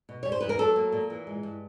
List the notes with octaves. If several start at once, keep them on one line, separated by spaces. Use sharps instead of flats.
B2
G3 C#5
C5
E2 B4
A#4
F#3 A4
A#3
A#2
E3
G#3
G2